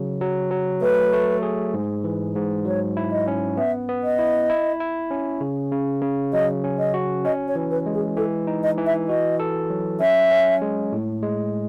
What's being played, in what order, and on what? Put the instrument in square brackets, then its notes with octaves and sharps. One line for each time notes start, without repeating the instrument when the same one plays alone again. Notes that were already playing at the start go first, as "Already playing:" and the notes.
Already playing: [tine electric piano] C#3 F#3
F#3
F#3
[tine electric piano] A3 [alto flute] B4
[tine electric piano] A3
G#4
G#2
E3
G#2
[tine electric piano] F#3 [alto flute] C#5
[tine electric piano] E4
[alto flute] D#5
[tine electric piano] C#4
[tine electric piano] B3 [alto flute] E5
[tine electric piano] B3
[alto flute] D#5
[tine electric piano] E4
E4
E4
C#4
C#3
C#3
C#3
[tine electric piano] F#3 [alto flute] D#5
[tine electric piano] C#4
[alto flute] D#5
[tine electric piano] F#4
[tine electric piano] C#4 [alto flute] D#5
[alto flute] C#5
[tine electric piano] E3
[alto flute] B4
[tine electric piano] G#3
[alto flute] G#4
[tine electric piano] E3 [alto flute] A4
[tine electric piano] D#4
[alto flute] D#5
[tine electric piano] E3
[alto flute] E5
[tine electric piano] F#4 [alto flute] D#5
[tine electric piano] A4
F#3
[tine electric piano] C#4 [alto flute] E5
[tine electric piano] C#4
G#3
A2
G#3